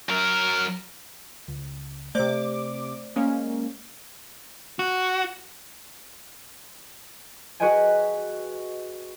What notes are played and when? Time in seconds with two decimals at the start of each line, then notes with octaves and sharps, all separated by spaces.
0.09 F#3 A#4
1.48 C#2
2.15 C3 A3 C5 D5 D6
3.16 G#3 A#3 C#4
4.79 F#4
7.60 F#4 G#4 B4 D#5 G5 G#5